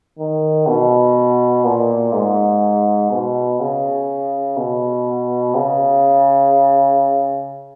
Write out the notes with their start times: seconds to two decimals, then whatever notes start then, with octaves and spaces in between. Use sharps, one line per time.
0.19 D#3
0.68 B2
1.65 A#2
2.14 G#2
3.11 B2
3.60 C#3
4.57 B2
5.55 C#3